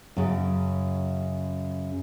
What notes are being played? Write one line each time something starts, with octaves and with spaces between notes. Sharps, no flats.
F#2 C#3